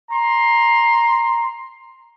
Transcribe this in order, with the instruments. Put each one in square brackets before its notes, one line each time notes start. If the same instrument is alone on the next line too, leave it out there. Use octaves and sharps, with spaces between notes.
[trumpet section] A#5 C6